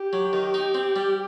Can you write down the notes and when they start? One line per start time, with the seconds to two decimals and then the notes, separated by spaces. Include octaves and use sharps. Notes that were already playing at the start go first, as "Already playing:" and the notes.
Already playing: G4
0.13 F#3
0.33 D#3
0.54 D#4
0.74 C4
0.96 G3